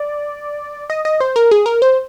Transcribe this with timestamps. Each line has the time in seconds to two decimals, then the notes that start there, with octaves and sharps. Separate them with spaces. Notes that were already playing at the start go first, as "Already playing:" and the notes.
Already playing: D5
0.90 D#5
1.05 D#5
1.20 C5
1.36 A#4
1.51 G#4
1.66 A#4
1.82 C5